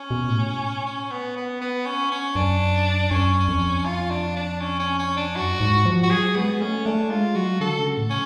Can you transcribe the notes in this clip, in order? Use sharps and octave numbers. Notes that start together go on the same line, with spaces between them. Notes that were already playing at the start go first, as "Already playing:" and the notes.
Already playing: C#4
B2
A2
C#4
B3
B3
B3
C#4
C#4
F#2 D4
F#2 C#4
F2
F4
D4
D4
C#4
C#4
C#4
D4
F#2 F#4
G#2
F3
F#4
F#3 G#4
G#3 B3
A3 C#4
A3 D4
G#3 F4
F#3 F#4
D3 A4
C#3
A2
C#4